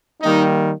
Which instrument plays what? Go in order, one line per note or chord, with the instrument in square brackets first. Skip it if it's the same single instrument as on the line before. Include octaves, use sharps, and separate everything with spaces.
[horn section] D#3 G3 A#3 D#4